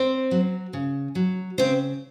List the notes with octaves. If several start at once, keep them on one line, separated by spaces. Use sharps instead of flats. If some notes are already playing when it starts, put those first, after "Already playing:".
Already playing: C4 C5
F#3
C#3
F#3
C#3 C4 C5